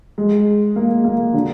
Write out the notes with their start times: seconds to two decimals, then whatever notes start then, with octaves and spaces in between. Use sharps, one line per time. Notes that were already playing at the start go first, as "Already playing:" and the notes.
0.18 G#3
0.76 A#3
1.05 A#3
1.34 D3